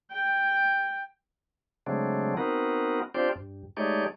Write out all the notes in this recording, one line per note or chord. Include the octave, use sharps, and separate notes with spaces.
G5
C#3 F#3 G#3 A3 C4 D4
B3 C4 D#4 F#4 A#4
C4 D4 F4 G4 C5 D5
G2
G#3 A3 D#4 G4 C#5 D5